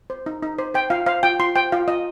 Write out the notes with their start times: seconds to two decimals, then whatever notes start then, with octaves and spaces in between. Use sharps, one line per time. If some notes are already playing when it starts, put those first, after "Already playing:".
0.10 C5
0.26 D#4
0.43 D#4
0.58 C5
0.74 C5 G5
0.90 F4 F5
1.06 C5 F5
1.23 F4 G5
1.40 F4 C6
1.56 C5 G5
1.72 F4 F5
1.88 F4 D#5